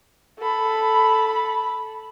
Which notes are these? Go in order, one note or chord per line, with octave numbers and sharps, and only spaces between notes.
A4 B5